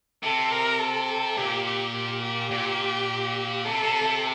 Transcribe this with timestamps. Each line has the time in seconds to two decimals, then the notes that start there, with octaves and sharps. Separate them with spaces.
0.23 C3 A4
0.52 A#4
0.79 A4
1.37 A#2 G4
1.66 G4
1.94 G4
2.22 G4
2.51 A#2
3.65 C3 A4
3.84 C3
4.03 C3